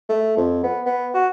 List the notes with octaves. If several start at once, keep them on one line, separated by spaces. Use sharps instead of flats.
A3
F2
B3
B3
F#4